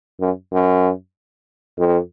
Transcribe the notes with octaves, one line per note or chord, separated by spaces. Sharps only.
F#2
F#2
F2